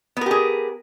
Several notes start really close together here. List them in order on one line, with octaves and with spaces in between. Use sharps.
B3 A#4 G4 G#4